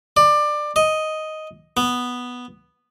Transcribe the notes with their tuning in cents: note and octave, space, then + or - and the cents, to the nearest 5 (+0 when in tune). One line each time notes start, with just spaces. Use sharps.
D5 +20
D#5 +5
B3 +0